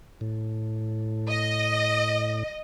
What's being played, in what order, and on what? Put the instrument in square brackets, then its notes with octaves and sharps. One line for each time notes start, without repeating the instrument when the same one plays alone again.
[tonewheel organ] A2
[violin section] D#5